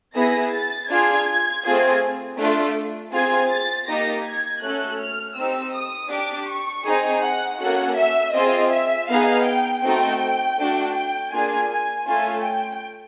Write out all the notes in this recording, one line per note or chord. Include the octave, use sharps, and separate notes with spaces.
B3 E4 G#4 A#6
A6
D4 F4 G#4 G#6
A3 C4 F4 G#4
A3 D4 F4
C4 F4 G#4 G#6
A6
A#3 D#4 G4 A#6
G#6
A3 C#4 F#4 A4 F#6
F6
C4 D#4 G4 E6
D#6
D4 G4 D6
C#6
C4 D#4 G#4
F#5
A#3 C#4 F#4 A4 F#5
E5
C4 F4 G#4 D#5
E5
B3 D#4 G#4 F5
G5
A3 C4 D#4 F#4 A4 G5
A3 D4 F#4
G5
A#3 D4 F4 G#4 G#5
G#5
A3 C#4 F4 G#5
G5